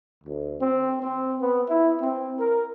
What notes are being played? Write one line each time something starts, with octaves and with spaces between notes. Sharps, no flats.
D2
C4
C4
B3
E4
C4
A#4